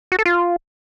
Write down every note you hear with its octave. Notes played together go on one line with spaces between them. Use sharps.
F#4
A4
F4